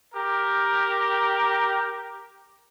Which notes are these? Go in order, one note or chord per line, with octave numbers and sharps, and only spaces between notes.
G4 A#4